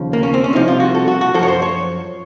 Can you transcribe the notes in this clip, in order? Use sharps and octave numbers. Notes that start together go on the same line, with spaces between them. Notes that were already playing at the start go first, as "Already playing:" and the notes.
Already playing: D#2 C#3 F3
A#3
C#4
C4
C#4
C2 C3 F3 D#4
F4
F#4
A4
F#4
F#4
F#2 F3 A4 C#5
C5
C#5